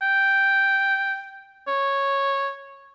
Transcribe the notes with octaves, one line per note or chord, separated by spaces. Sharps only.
G5
C#5